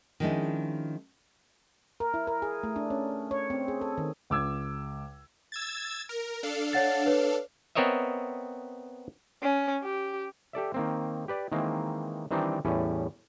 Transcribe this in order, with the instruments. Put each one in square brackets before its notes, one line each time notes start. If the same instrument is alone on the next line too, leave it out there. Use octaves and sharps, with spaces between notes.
[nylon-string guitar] D#3 F3 G#3 C#4 D4 E4
[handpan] A#4
E4
A#4
G#4
A3
D4
C#4
C#5
C4
G#4
A4
D#3
[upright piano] C#2 D6 E6 G#6
[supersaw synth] E6 G#6 A6
A#4
D4 A4 F5
[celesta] C#5 F#5 A6
B4 C#5
[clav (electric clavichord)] B3 C4 A#4 C#5 D#5 E5
[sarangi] C#4
G4
[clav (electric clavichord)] G4 A4 D5 E5
D#3 A#3 C4
G4 B4 D5
D#3 E3 G#3 A#3 C4
D#3 E3 G3 C4 D4 D#4
E2 A2 G3 C#4